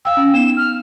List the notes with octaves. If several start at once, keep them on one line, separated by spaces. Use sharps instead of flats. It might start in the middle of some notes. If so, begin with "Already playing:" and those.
F5 G5 E6
C#4
B3 D#4 E7
F6